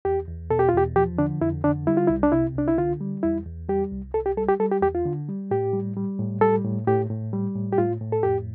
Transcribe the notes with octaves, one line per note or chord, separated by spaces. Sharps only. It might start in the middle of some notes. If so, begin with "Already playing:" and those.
E2 G4
E2
B2 A4
G4
F4
E2 G4
F3 G4
D3 D4
F2 E4
D3 D4
G3 E4
F4
C2 E4
D4
C3 E4
C2 D4
E4
D3 F4
G3
E2 E4
E2
G3 G4
C2
C2 A4
G4
G3 A4
G4
G3 A4
G4
E2 G4
F4
D3
G3
A2 G4
G3
G3
A2
G3 A4
A2
A2 G4
A2
G3
A2
G4
A2 F4
A2
A4
F2 G4